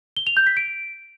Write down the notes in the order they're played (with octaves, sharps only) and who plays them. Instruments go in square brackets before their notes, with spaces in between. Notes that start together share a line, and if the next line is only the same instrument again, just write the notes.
[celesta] G7
F7
G6
B6
D7